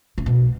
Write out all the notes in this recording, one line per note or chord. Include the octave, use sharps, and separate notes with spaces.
C#3
B2